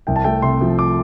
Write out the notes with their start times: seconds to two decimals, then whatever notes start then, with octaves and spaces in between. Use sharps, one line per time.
0.07 C2 G5
0.16 A5
0.24 A3 G5
0.42 C3 C6
0.61 F3
0.79 D6